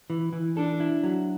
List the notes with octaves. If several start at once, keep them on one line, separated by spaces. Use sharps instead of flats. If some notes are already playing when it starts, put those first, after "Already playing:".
E3
E3
D4 A4
E4
F#3